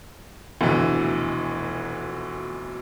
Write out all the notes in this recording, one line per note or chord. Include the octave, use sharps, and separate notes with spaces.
F1 D2 B2 E3